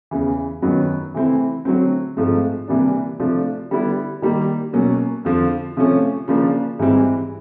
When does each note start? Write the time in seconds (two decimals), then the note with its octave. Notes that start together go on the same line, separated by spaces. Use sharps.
0.11 E2 C#3 E3
0.62 F#2 D#3 F#3 B3
1.14 C3 E3 A3 C4 E4
1.65 D3 F#3 A3 C4
2.17 G#2 F3 A3 C4
2.68 C3 E3 G3 A#3 D4
3.20 C3 F3 A3 D4
3.71 D3 G3 B3 E4
4.22 D#3 G3 A#3
4.73 B2 F#3 A#3 C#4
5.25 F2 D3 F3
5.77 C3 F3 A3 C#4
6.28 C#3 F3 A#3 D4
6.79 G#2 E3 G3 C4 E4